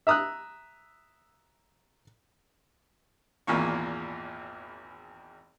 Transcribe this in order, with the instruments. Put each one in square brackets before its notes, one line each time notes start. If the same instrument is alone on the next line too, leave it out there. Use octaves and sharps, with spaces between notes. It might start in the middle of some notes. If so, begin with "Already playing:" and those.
[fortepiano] E5 A#5 D#6 E6 F#6
G#1 E2 A#2 A#3 C#6